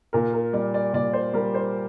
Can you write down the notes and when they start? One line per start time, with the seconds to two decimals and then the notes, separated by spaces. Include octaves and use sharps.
0.13 A#2 A#4
0.33 A#4
0.53 G3 D5
0.74 D5
0.93 A#2 D5
1.13 C5
1.34 G3 A#4
1.55 C5